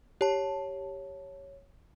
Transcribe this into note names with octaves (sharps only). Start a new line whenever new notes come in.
G4 C#5 A5